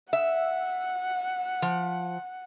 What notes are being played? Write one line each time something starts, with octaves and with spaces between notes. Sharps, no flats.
E5 F#5
F3